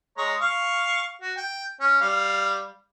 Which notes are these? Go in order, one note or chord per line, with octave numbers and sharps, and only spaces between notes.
G#3 C#5 A#5
F5 C#6
F#4
G5
C#4
G3 F5